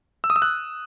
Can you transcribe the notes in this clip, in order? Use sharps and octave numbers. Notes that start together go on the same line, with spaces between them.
E6
D#6
E6
F#6